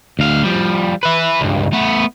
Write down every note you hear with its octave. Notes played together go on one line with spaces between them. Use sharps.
D2 F5
F3 G3
B4 E5
C#2 G2
A3 B3